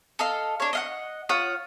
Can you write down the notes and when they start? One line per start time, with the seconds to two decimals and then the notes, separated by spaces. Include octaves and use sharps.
0.19 A4 D#5 F5
0.60 D4 C#5
0.73 D#5 F5 F#5
1.29 F4 C#5 F#5 D#6